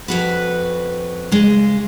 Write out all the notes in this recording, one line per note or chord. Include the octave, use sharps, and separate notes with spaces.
F2 F#4 B4
C#3 G#3